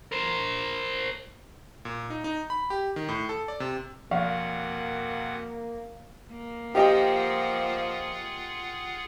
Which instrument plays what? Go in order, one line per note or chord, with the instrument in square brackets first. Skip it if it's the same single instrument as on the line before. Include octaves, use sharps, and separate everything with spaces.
[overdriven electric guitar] A#4 C5
[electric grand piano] A#2
D#4
D#4
B5
G4
D#3
A2
A4
D5
C3
[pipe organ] F2 B2 F#5 [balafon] F3 [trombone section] A#3 [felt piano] F5
[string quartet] A#3
[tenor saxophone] F3 [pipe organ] F4 G#4 F#5 [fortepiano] G4 D#5 G5